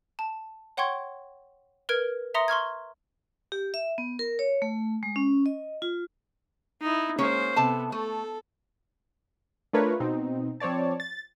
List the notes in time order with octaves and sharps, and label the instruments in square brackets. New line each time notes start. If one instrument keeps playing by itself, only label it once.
[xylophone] A5
C#5 F#5 G5 C6 C#6 G#6
A#4 B4 F6 G#6 D7
E5 A#5 C6 D#6 A#6 C#7
C6 C#6 F6 G#6
[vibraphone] G4
E5
B3
A#4
C#5
A3
G#3
C#4
D#5
F4
[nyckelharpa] D#4 E4
[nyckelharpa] G#3 C5 [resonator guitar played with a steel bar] A#3 C#4 C#5
[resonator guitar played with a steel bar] C3 A4 A5 [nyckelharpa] B3
[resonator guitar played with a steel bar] A3 [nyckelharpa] A4
[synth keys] A3 D4 F4 A#4 B4 C#5
B2 C4 D#4
F3 C4 C#5 D5 A5
A6